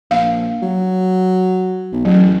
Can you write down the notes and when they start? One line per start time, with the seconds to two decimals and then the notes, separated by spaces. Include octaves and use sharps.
0.11 A#1 F5
0.63 F#3
1.92 B1
2.05 A1 F#3